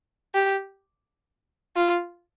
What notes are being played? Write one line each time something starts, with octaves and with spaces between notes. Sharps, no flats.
G4
F4